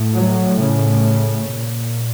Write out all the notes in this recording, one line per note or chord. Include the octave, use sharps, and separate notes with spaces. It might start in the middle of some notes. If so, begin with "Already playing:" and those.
Already playing: A2
F#3
C#3
A#2